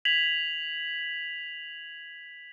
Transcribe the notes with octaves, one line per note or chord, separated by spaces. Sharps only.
G#6 B6 F7 F#7